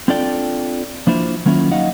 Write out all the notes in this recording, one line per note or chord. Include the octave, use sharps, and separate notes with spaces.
C4 D4 F4 A4 D5 G5
F3 A#3 D4 E4 F4 C5
D#3 F#3 A#3 C#4 E4 F4
D#2 F#3 D#4 D#5 F5 F#5